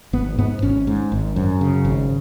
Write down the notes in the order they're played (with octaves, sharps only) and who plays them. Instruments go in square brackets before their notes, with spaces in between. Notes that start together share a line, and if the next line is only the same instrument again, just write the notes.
[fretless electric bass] G#1 B3
G#2 B3
G#1 C#4
G#2
G#1
F#2
C#3
G#1